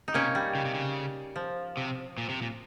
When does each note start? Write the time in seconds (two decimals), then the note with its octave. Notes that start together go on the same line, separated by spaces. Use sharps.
0.08 D#4
0.14 C3 A#3 C#4
0.35 G3
0.55 C#3
0.65 C3
0.74 C#3
1.36 F3
1.77 C3
2.18 A#2
2.29 C3
2.42 A#2